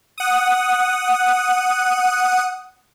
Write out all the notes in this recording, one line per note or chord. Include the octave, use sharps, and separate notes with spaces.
F#5 D#6